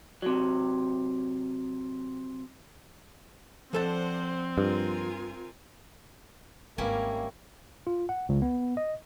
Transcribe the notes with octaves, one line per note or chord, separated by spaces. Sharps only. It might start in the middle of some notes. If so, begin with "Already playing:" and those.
C3 F#3
F3 C4 D4 A4 C5 F#5 A5
G2 F4 A#4 G#5
G#1 G3 A#3 C#4 E4
F4
F#5
C#2
B3
D#5